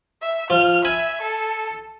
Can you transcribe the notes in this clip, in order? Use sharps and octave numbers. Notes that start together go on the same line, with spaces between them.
E5
F3 F6
E5 G#5 B5
A4